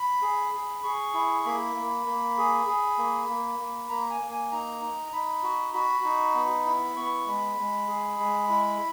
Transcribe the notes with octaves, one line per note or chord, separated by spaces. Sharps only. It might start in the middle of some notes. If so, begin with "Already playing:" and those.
Already playing: B5
G#4
G#4
G#4 C#6
E4
A#3 B5
A#3
A#3
G#4
G#4
A#3
A#3
A#3
A#3 A#5
G#5
A#3
G#5
D#4 A#5
D#4
A#5
D#4 B5
F#4
F#4 B5
D#4
B3
E4
B3 C#6
G#3 B5
G#3
G#4
G#3
E4